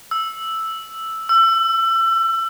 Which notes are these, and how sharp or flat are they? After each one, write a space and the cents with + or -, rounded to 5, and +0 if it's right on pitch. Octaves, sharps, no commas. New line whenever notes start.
E6 +0
E6 +30